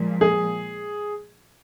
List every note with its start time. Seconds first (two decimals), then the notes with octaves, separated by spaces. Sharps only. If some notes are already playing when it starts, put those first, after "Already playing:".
Already playing: A#2 F3 G#3
0.21 G#4